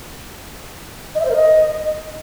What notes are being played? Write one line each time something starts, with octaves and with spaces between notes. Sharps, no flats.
D#5
E5
C5
A#4
D#5